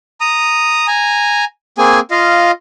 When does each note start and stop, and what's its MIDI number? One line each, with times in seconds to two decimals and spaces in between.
0.21 0.87 82
0.21 0.87 87
0.88 1.45 80
0.88 1.45 82
1.78 2.00 58
1.78 2.00 60
1.78 2.00 68
1.78 2.00 80
2.11 2.51 65
2.11 2.51 75
2.11 2.51 77